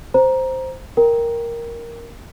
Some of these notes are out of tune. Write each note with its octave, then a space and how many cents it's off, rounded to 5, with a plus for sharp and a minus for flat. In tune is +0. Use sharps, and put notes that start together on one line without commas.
C5 +0 A#5 +15
A#4 +0 G5 +0 A#5 +15